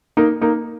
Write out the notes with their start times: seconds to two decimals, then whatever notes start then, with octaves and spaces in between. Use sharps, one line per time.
0.17 A#3 D#4
0.41 A#3 D#4